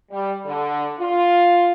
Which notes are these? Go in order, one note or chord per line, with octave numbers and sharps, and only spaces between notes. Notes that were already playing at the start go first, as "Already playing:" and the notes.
G3
D3
F4